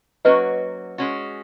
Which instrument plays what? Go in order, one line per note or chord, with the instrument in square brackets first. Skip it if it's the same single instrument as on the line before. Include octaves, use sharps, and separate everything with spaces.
[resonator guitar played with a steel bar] F#3 A#3 C#4 F#4 [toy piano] B4 D#5
[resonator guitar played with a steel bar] G#3 C#4 F#4